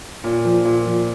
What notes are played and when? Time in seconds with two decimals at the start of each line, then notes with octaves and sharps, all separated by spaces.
0.24 A#2
0.45 F3
0.65 A#2
0.86 F3